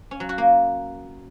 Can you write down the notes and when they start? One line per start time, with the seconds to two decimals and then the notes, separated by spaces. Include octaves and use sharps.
0.11 C#4
0.20 F#3
0.29 F#4
0.38 A#3